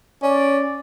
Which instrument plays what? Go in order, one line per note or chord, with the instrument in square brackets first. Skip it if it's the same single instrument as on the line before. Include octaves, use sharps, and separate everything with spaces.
[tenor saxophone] C#4 [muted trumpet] D5